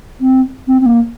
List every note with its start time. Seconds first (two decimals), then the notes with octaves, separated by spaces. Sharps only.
0.21 C4
0.68 C4
0.81 C4
0.86 A#3